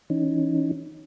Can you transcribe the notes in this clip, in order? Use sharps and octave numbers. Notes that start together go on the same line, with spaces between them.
E3 C#4 D#4